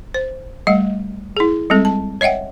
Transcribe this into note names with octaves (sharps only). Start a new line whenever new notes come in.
C5
G3 A3 D#5 F#5
E4 G#4
G3 G#3 C4 A4
A5
C#5 D#5 E5 F#5 G5